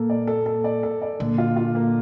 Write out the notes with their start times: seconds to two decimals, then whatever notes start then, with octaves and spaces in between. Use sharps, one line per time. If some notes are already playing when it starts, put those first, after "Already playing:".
Already playing: A#2 A#3 A4
0.10 D5
0.27 A4
0.46 A4
0.64 D5
0.83 A4
1.02 D5
1.20 A#2 D3
1.38 F4
1.56 F4
1.75 A#3